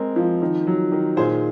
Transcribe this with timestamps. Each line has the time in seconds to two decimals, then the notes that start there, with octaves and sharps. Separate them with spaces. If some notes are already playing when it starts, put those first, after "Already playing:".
Already playing: G#3 C4 A#4
0.16 F3
0.42 D#3
0.67 F#3
0.92 D#3
1.17 A#2 G#4 C5